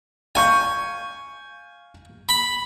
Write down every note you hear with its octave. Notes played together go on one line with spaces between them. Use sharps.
F5 G#5 C#6 G6
B5